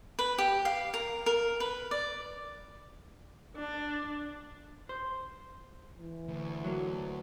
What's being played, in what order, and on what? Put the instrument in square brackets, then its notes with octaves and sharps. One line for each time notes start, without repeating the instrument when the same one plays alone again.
[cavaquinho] B4
G4
F5
A#4
A#4
B4
D5
[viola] D4
[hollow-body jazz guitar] C5
[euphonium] E3
[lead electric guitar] D2
[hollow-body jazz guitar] F#3 A#3